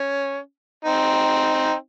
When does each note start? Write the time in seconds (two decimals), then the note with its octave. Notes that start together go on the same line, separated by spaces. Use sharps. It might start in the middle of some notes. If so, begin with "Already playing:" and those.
Already playing: C#4
0.85 C4 D#4